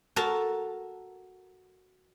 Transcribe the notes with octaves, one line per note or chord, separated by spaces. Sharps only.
F#4 A4 A#4 A5 A#5